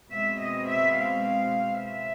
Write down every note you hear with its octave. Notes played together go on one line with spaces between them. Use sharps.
B2 G#3 C4 E5
D#5
E5
F5
E5